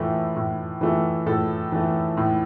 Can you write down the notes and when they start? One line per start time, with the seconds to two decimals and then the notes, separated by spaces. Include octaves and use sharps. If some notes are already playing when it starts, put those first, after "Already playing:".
Already playing: A2 E3 A3
0.36 A2
0.81 E3 A3
1.26 A2 A4
1.72 E3 A3
2.17 A2